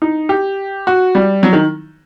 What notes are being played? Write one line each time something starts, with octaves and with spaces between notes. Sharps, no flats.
D#4
G4
F#4
G3
F#3
D#3